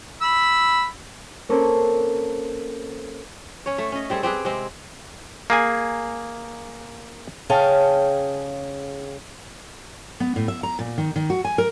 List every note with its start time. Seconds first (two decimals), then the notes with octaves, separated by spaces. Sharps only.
0.21 B5 E6
1.49 A#3 C4 C#4 A4 A#4 C5
3.66 C#4 C#5
3.78 A3
3.92 C#4 D#5
4.10 G3 C4 G#4 A4
4.23 C4 G4 G#4 B4
4.45 C3 G#3 C4
5.50 A#3 G#4 G#5
7.49 C#3 C#4 G#4 F5 G5 A5
10.20 B3
10.36 A2
10.48 E5
10.63 A#5
10.79 A#2
10.98 D#3
11.16 D#3
11.30 F#4
11.45 G#5
11.58 A#4